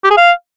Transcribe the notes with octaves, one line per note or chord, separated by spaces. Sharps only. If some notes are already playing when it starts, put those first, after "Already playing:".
G4
G#4
F5